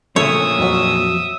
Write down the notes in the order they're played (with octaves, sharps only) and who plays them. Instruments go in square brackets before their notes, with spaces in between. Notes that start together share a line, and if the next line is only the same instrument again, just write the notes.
[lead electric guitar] A#2 F3 [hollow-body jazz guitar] C#3 A3 C#4 [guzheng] C#5 [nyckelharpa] E5 D#6
[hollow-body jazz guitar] F2 F#3